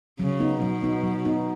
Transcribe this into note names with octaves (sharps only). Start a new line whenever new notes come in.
C#3 F#3
B3 D#4
B2 F#3
B3 D#4
F#3
B3 D#4